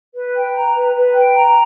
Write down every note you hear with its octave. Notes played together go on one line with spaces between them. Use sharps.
B4
G5
A#5
B4
B4
G5
A#5